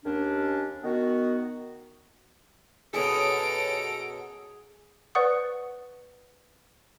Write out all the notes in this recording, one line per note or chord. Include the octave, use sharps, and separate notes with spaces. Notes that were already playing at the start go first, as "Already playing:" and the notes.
D#2 C#4 D4
D#3 B3 F#4
F#2 B2 F#3 G#4 A4 A#5 D#6 D7
B4 C5 D5 F#5 C#6 D#6